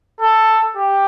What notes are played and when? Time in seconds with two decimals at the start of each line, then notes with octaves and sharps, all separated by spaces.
0.21 A4
0.75 G4